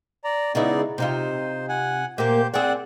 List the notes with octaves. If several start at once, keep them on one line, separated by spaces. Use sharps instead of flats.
D5 A#5
C#3 G#3 B3 D#4 E4 D5
C3 D#4 F4 C5
F#5 G#5
A#2 A#3 G4 C5 G6
C4 G#4 D5 F#5